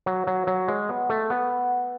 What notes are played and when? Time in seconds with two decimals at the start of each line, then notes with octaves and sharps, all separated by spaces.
0.06 F#3
0.27 F#3
0.47 F#3
0.68 G#3
0.89 B3
1.09 A3
1.30 B3